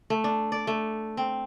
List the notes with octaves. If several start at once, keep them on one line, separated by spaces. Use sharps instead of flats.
A3
D4
D5
A3
C4